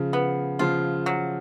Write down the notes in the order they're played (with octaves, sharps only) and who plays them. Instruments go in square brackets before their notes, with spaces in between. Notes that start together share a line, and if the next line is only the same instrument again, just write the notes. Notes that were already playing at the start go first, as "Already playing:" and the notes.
Already playing: [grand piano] C#3 F3
[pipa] B3
[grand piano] C#3 F3 [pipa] F4
[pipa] F#3